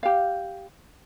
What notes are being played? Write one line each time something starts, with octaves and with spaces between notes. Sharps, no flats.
G4 F5